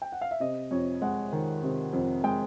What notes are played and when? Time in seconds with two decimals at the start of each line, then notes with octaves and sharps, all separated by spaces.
0.02 G5
0.12 F#5
0.21 F5
0.31 E5
0.40 C3 D#5
0.71 F2 C#5
1.02 G#3 F#5
1.33 D#3
1.63 C3
1.93 F2
2.24 G#3 G5